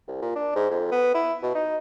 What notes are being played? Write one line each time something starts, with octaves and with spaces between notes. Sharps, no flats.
C2
A#2
D4
G#2
F2
B3
E4
B2
D#4